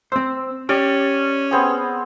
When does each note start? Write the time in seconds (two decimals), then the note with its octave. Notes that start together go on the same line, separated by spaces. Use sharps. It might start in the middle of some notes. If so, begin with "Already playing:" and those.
0.12 C4 C5 E6
0.69 C#4 G4 D5
1.51 B3 C4 G#4